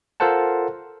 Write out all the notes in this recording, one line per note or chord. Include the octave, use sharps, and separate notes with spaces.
F4 A4 A#4 C5 F#5 A5